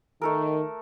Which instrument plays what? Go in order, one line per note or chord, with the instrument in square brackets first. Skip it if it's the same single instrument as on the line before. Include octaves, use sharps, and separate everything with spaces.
[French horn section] D#3 [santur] A3 A4 A#4